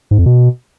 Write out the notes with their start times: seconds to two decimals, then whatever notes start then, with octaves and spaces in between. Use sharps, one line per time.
0.11 G#2
0.18 F2
0.26 B2